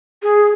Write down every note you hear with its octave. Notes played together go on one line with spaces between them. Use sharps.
G#4